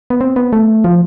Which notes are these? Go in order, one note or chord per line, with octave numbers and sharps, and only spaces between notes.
B3
C4
B3
A3
F3